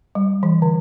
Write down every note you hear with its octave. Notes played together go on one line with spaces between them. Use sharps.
G3
E3
D3